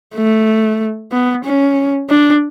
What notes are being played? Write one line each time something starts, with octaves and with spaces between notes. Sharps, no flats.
A3
B3
C#4
D4